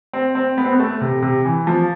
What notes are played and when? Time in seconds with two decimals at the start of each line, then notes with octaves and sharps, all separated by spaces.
0.13 C4
0.35 C4
0.57 B3
0.64 C4
0.71 B3
0.80 A3
1.01 C3
1.22 C3
1.45 E3
1.67 F3